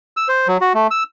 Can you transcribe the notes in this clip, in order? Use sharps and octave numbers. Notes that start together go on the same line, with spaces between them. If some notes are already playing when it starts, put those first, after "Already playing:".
E6
C5
F#3
F#4
A3
E6